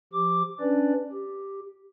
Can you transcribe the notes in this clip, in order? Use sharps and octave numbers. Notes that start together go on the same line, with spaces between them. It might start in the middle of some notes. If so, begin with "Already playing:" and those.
F3 G4 D6
C#4 D4 B4 D5
G4